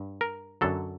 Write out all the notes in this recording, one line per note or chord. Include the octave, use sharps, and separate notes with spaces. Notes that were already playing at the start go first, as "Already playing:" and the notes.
Already playing: G2
A#4
F#2 D3 F#3 A4